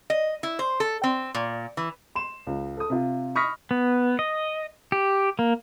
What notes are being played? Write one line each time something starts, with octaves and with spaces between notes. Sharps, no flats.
D#5
E4
C5
A4
C4
A#2
E3
C6 E7
C#2
A4 D#6
C3 F4
B5 C#6 D#6 F6 A#6 B6
B3
D#5
G4
A#3